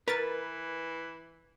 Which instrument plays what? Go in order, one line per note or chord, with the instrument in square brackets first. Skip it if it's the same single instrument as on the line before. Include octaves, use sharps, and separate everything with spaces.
[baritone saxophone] E3 [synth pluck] A#4 A6 [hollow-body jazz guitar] B4